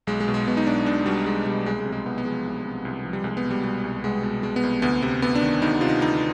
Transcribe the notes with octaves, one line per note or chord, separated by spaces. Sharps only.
B1 G#3
G#3
B2
G#3
B2 B3
D#4
B1 D4
B1 D4
B2 G3
B2 G#3
B1 G3
C2 G#3
G#3
C3
G#3
C2 B3
B3
F3 G#3
C2
C3
C2
F3
G3
C2 G#3
B3
B2
G3
B2 G3
C2
C2 G#3
B2
B2 G#3
B3
C2
D2 B3
C3 B3
D2 B3
D4
D#3
D2 D#4
C3 F4
D#4
D2 D#4